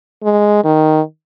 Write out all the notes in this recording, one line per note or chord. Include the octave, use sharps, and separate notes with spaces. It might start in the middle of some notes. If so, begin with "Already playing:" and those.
G#3
D#3